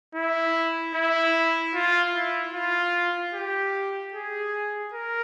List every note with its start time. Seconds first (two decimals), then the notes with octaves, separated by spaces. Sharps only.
0.15 E4
0.95 E4
1.74 F4
2.15 E4
2.55 F4
3.34 G4
4.14 G#4
4.93 A#4